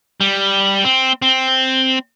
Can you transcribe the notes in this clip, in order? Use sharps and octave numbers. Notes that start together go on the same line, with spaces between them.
G3
C4
C4